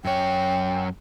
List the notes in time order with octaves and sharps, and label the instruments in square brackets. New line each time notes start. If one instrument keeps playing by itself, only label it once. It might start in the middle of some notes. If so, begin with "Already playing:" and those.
[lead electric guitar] F#2 C#5 [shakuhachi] G5